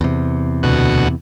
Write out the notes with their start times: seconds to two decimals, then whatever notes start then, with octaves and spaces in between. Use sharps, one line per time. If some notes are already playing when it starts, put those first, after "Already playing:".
0.01 E2 C3
0.63 D2 B2 F#4